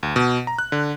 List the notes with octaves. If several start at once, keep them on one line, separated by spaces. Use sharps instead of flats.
D2
B2
A#5
F#6
D3